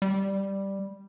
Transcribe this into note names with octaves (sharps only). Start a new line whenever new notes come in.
G3